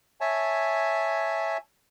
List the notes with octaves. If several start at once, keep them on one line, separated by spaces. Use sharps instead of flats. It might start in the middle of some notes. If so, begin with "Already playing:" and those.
C#5 E5 G#5 A5